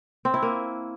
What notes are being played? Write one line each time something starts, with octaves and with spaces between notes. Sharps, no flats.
C4
E4
A#3